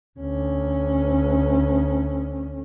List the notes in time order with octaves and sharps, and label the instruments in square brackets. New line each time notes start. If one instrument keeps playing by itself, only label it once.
[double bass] D2 C#4